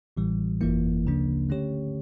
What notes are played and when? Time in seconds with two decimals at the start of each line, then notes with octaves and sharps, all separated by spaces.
0.17 A1 A2 E3 G3
0.61 G1 F2 E3 A#3 E4
1.05 D2 C#3 F3 A#3 D4
1.50 D3 A3 C#4 G4 C#5